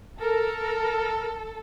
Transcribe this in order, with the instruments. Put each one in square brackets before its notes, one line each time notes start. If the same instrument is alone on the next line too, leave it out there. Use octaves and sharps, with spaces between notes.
[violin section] A4 [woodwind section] A#4